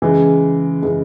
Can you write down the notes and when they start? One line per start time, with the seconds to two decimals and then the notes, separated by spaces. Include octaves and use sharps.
0.02 C#3 E3 G#3
0.82 C#3 E3 G#3